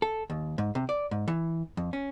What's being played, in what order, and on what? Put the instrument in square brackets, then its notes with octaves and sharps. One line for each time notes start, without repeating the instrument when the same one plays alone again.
[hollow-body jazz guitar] A4
D#2
G#2
C3
D5
G#2
E3
F2
C#4